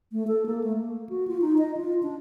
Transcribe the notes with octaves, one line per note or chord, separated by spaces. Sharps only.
A3
A4
A#3
A3
A#3
F#4
F4
D#4
D#5
F4
D4